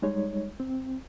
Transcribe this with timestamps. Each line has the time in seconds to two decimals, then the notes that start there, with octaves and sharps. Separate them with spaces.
0.02 G3 G#3 D#4 C#5
0.60 C4